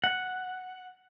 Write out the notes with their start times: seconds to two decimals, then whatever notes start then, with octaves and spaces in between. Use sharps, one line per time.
0.04 F#5